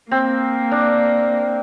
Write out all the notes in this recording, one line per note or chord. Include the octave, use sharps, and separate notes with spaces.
A#3 C4
D4